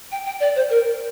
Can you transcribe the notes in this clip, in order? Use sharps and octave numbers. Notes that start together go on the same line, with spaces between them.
G5
G5
D5
C5
A#4